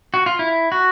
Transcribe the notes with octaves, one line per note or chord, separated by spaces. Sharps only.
F#4
F4
E4
F#4